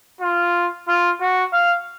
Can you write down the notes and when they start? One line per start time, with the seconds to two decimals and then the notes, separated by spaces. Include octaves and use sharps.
0.21 F4
0.88 F4
1.21 F#4
1.53 F5